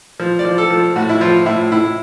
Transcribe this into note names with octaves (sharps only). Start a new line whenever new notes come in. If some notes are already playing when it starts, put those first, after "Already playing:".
F3
D5
F3
A4
F3
A2 F#4
E4
F3 F4
A2 E4
A2 E4